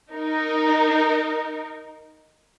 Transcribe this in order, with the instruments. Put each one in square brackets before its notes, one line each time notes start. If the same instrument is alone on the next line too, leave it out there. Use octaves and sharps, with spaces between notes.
[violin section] D#4 A#4